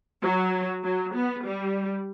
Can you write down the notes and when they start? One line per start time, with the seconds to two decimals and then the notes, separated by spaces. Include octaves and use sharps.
0.22 F#3
0.84 F#3
1.14 B3
1.45 G3